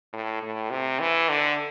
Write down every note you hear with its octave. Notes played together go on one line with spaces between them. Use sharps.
A2
A2
C3
E3
D3